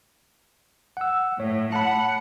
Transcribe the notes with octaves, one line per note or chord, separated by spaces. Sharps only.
F#5 E6
A2 C#5
F#5 A5 B5